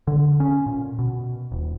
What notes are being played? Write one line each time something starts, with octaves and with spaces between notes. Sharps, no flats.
D3
C#4
A#2
B2
D#1